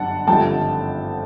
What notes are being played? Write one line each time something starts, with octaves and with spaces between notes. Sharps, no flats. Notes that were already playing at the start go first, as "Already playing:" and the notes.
Already playing: G1 F#2 D3 F#5 A5
G#1 G2 D3 F3 A3 G5 A5